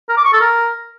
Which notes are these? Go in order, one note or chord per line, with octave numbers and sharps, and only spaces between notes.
A#4
D6
C#6
A4
A#4